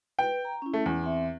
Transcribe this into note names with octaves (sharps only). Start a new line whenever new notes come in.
B4 G5
A#5
C#4 E4
A3
E2
C4 E5